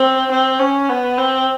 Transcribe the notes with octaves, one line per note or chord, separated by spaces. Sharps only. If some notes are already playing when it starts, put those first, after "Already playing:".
Already playing: C4
C4
C#4
B3
C4